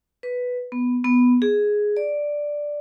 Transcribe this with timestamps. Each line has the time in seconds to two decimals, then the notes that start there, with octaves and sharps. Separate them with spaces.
0.23 B4
0.72 B3
1.05 B3
1.42 G#4
1.97 D5